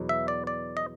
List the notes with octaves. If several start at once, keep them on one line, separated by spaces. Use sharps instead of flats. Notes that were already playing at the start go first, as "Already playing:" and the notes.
Already playing: E2 B2 F#3 B3
E5
D5
D5
D#5